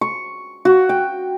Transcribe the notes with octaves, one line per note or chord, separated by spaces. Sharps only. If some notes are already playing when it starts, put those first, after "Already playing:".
C#6
F#4
G5